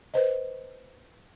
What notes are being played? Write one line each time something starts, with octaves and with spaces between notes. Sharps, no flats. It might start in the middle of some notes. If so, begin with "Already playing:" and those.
B4 C5 D#5